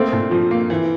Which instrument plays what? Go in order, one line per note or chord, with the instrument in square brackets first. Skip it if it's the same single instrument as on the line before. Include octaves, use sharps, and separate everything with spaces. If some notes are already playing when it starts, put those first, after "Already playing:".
Already playing: [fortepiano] A3 C4 [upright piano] A#3
[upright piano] A#2
F3
A#3
E3